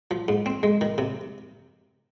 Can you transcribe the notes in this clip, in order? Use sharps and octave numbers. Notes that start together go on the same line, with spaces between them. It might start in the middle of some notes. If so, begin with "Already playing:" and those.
F3
G#2
C4
G#3
D#3
C3